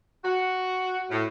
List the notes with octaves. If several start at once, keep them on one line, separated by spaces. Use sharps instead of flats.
F#4
A2